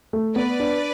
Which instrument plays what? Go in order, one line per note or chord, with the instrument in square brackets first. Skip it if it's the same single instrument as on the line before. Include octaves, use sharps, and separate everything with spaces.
[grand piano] A3
[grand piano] B3 [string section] B4 D5
[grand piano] D4